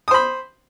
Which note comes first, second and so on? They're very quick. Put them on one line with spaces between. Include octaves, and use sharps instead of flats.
D#6 C5 B5